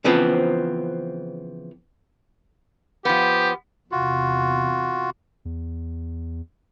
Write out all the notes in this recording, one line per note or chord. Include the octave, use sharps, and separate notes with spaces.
C#3 E3 F3 B3 C4
F3 B3 G4
E2 C3 F4 F#4
E2